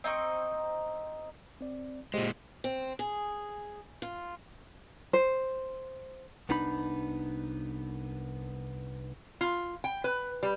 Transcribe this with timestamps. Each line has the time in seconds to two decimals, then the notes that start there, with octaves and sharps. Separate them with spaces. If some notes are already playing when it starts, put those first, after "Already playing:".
0.04 C4 D#4 D#5 C#6
1.61 C4 D5
2.14 A#2 G#3 G4 C5 D#5
2.64 C4
2.99 G#4
4.02 F4
5.13 C5
6.49 C2 B3 D4 D#4 B5
9.41 F4
9.84 G5
10.04 B4
10.43 G3